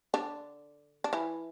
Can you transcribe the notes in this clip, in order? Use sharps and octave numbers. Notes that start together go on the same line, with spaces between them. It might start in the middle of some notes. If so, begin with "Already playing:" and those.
D3 D4
D4
E3 E4